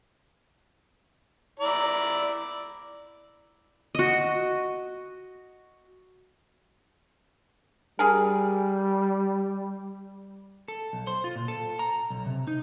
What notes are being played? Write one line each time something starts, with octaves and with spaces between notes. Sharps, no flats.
E4 D5 A#5
F#4 D#5
G3 G#4 A#4
A4
B1
C5
F4
A#2
A4
A#5
B1
C3
D#4